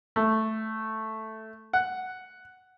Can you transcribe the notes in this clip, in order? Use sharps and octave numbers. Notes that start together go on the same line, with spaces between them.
A3
F#5